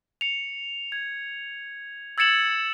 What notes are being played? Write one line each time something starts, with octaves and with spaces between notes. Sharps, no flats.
C#7 F7
G#6
E6 G#6 A6 C#7 E7 F#7